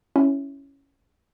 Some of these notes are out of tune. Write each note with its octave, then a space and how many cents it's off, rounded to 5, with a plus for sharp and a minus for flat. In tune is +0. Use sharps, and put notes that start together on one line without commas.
C#4 +0 E4 +0